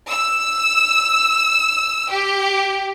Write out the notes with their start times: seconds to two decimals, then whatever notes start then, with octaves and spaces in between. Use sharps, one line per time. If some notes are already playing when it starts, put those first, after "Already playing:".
0.11 E6
2.11 G4